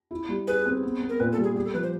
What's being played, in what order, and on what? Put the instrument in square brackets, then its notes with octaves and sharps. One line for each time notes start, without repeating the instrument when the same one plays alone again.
[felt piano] E4
G3
[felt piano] G#4 [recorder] B4
[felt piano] C4
B3
B3
[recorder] A#4
[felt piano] A#2 [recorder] B4
[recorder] A4
[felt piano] G3
[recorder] G#4
[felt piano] G4 [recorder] G#4
[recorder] A4
[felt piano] F3 [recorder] B4
[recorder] C5